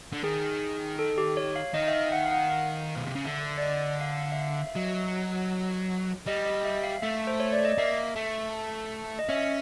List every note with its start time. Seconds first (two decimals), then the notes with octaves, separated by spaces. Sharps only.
0.12 D3
0.24 D#3 G#4
0.99 A4
1.18 G4
1.37 C#5
1.56 F5
1.74 D#3 D#5
1.88 E5
1.93 F5
2.12 F#5
2.26 F5
2.31 F#5
2.50 F5
2.96 B2
3.05 C3
3.16 C#3
3.25 D3 E5
3.58 D5
3.63 D#5
4.01 F5
4.20 F5
4.32 E5
4.39 F5
4.57 E5
4.67 E5
4.76 F#3 D#5
6.27 G3 D#5
6.46 D#5
6.65 E5
6.84 F5
7.02 A3 E5
7.27 C5
7.40 C#5
7.52 D5
7.65 D#5
7.78 A#3 E5
8.16 A3
9.19 D#5
9.29 C#4 E5